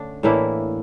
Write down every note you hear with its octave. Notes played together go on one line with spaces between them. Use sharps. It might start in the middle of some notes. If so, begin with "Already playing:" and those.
Already playing: D3 A3 C#4 D4
A2 E3 A#3 D4 E4